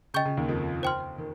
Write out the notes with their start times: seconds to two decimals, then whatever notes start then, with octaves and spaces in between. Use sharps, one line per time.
0.14 C#3 D#5 G5 C#6 G6
0.25 C#3
0.37 D#2 D#3
0.48 F2 F3
0.83 C5 G5 C6 F6
1.18 D#3